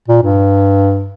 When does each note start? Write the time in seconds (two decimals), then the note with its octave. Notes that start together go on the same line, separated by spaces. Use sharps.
0.08 A#2
0.23 G2